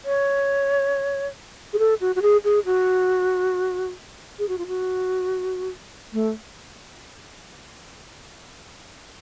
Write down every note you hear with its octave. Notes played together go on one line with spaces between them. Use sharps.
C#5
G#4
A4
F#4
F#4
G#4
G#4
F#4
G#4
F#4
F4
F#4
A3